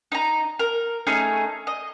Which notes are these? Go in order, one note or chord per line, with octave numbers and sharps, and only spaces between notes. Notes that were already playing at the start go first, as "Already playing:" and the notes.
D#4 A#5
A#4
A3 C#4 D#4 G#4
D#5